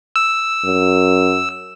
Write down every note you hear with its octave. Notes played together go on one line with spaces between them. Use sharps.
E6
F#2